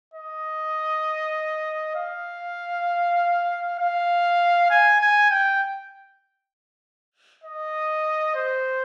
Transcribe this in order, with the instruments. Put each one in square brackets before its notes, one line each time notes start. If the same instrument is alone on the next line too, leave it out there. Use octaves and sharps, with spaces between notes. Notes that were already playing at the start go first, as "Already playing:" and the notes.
[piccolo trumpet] D#5
F5
F5
G#5
G#5
G5
D#5
C5